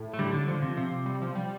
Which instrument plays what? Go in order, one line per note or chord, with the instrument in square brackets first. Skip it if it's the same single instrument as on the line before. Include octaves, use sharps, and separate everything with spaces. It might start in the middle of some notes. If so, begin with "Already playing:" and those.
Already playing: [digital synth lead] A2
[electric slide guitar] A3
D3 G3
D3
[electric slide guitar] D3 [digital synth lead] F3
[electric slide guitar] C3
C3
[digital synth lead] G3
F3
G3